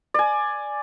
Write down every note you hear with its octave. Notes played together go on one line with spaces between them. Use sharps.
D5 G#5